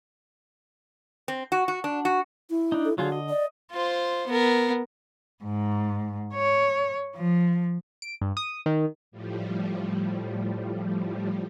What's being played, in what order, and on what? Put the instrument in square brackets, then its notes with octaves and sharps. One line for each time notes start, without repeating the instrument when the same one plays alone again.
[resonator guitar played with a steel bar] C4
F#4
F#4
D4
F#4
[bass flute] E4
[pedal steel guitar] D4 D#4
[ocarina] A4
[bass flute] D3 [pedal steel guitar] F#3 F4 G#4 [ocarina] F#4
[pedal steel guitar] D#5
[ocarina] D5
[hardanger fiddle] F4 C5
B3 A#4
[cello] G#2
C#5
F3
[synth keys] D7
G2
D#6
D#3
[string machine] A2 F3 G3